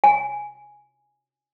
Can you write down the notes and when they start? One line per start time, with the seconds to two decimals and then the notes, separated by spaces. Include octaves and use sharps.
0.04 G#5